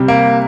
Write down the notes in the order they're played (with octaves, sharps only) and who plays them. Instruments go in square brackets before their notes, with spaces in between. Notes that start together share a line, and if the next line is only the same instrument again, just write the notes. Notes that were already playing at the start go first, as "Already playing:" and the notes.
Already playing: [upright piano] C3 G3 C4
[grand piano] A#3